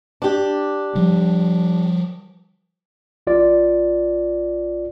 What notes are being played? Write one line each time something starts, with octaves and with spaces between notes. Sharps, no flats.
D4 G4
F3 G3
A1 F4 D5